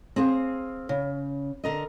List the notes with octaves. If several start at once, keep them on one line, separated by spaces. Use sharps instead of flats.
C4 G#4 F5
C#3
D3 A#4 D#5